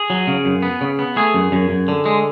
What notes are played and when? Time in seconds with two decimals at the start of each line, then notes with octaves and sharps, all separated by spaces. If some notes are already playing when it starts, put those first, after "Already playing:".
Already playing: G#4
0.10 F#3
0.27 C#3
0.45 F#2
0.62 B3
0.81 C#3
0.99 B3
1.16 A3 G#4
1.34 F#2
1.52 F#2
1.70 F#2
1.88 D3
2.06 G#3